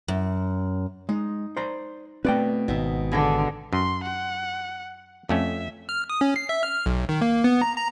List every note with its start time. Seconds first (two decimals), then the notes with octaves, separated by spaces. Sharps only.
0.08 F#2
1.09 G#3 D#4
1.57 C5 D5 A#5
2.25 B2 A3 C4 B4 D5 G5
2.68 G#1 B2 D#4 E5
3.12 D3 G#4 D5 G5
3.73 F#2 C6
4.03 F#5
5.29 F2 A3 C#4 E5
5.89 F6
6.10 D#6
6.21 C#4
6.36 C7
6.49 E5
6.63 F6
6.86 B1
7.09 D#3
7.21 A#3
7.44 B3
7.62 A#5
7.77 A#5